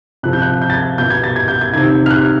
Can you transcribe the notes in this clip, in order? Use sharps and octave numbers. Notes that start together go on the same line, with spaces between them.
C3 F3 F#6
G6
F#6
G6
A6
G#6
B2 G6
G#6
A6
G#6
G6
G#6
C3 D#3 G#6
F6
F#6